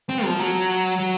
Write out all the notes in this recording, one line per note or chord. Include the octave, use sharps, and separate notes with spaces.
C4
F3
F#3
F#3